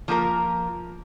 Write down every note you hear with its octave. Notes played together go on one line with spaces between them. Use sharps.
F3 A#3 F4 A#4